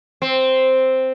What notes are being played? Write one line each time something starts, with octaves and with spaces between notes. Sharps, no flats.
C4